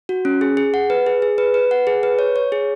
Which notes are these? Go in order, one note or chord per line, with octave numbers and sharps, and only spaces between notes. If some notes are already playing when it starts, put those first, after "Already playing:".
F#4
C#4
G#4
G#4
F#5
B4
G#4
G#4
B4
B4
F#5
G#4
B4
C#5
C#5
G#4